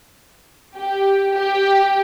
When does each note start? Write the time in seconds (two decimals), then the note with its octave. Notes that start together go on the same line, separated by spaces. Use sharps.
0.75 G4
1.34 G4